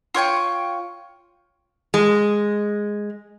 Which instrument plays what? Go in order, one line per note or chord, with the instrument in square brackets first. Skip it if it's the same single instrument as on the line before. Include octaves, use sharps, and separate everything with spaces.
[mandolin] F4 C#5 G5 C#6
[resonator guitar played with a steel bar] G#3